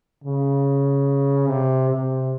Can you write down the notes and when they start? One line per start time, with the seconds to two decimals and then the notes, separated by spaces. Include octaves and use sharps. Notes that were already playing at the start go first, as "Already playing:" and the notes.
0.24 C#3
1.48 C3
1.90 C3